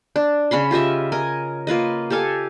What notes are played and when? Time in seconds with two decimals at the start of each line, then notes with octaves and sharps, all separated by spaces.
0.16 D4
0.51 C#3 C#4 B5 C6
0.71 F4 G4 D#5 E5
1.12 A#4 D#5 G#5
1.67 A#3 F4 B4 D#5
2.10 G4 A4 F5 G#5